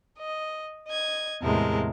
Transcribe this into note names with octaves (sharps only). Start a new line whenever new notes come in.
D#5
D#5 G#6
E2 A2 C3 G#3 A#4 A5